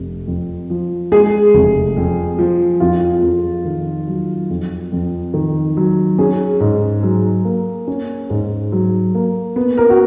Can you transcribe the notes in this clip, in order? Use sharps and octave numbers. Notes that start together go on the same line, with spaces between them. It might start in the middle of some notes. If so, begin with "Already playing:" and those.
Already playing: F1
F2
F3
G#3 G#4
F1
F2
F3
F2 F4
F2
D#3
F#3
F2
F2
D#3
F#3
C#4 G#4
G#2
F#3
A#3
C#4
G#2
F#3
A#3
B3
A#4
F#4